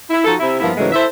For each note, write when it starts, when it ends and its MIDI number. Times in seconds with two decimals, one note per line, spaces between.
0.10 0.21 64
0.25 0.34 53
0.25 0.34 63
0.25 0.34 66
0.25 0.34 69
0.39 0.58 48
0.39 0.58 64
0.60 0.71 43
0.60 0.71 53
0.60 0.71 58
0.60 0.71 59
0.60 0.71 64
0.77 0.91 44
0.77 0.91 49
0.77 0.91 52
0.77 0.91 54
0.77 0.91 56
0.77 0.91 57
0.92 1.05 64
0.92 1.05 69
0.92 1.05 72
0.92 1.05 76